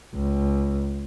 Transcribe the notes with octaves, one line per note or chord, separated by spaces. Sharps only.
C#2